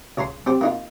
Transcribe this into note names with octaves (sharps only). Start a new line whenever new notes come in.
C#2 C#5 A#5 C6
C4 G4 C5
A#3 D#4 F4